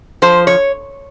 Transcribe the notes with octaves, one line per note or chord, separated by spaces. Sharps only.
F3 C5
C#5